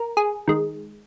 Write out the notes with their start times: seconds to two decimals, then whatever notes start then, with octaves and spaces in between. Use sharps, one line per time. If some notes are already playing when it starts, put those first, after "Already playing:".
Already playing: A#4
0.17 G#4
0.48 D#3 G#3